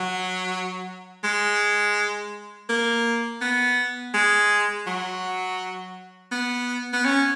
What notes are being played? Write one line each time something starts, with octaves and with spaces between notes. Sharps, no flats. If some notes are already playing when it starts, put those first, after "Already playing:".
Already playing: F#3
G#3
A#3
B3
G#3
F#3
B3
B3
C#4